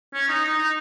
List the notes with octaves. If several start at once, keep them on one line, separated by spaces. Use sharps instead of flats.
C#4
D#4
D#4
D#4